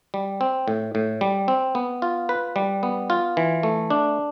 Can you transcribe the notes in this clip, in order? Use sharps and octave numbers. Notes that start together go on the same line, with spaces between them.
G3
C4
A2
A2
G3
C4
B3
F4
B4
G3
B3
F4
E3
A3
D4